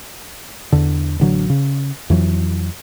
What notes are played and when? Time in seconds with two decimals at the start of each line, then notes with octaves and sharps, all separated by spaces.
0.72 E2 D3
1.20 A1 D3 F#3
1.50 C#3
2.10 F2 E3 F#3